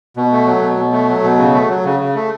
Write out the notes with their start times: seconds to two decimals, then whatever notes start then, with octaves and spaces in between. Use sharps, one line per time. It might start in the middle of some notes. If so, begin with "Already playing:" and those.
0.17 B2
0.32 A3
0.46 F#3
0.62 B2
0.77 B2
0.93 A3
1.09 F#3
1.24 B2
1.38 C#3
1.54 A3
1.70 F#3
1.85 C#3
2.00 C#3
2.15 A3